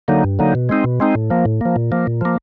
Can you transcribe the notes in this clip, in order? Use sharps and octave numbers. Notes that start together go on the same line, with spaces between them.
D3 F#3 A#3 D#4
G2
D3 F#3 A#3 D#4
B2
G#3 C4 D#4
B2
G#3 C4 D#4
A2
F3 A#3
A2
F3 A#3
A#2
F3 A#3
A#2
F3 A#3